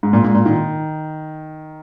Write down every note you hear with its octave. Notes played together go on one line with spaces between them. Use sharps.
G#2
A#2
G#2
A#2
D#3